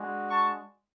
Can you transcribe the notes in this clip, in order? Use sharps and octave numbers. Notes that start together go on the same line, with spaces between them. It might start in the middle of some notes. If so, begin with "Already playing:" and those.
Already playing: G#3 D4 F#4
A5 C#6